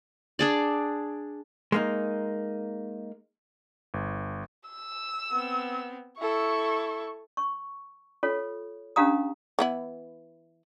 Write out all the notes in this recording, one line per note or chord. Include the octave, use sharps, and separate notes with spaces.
D4 G#4 D5
G#3 A#3 D#4
G1
E6
B3 C4
E4 A4 C#6
C#6
F4 A4 C#5
C#4 D4 G4 F5 A#5 D#6
E3 B3 E4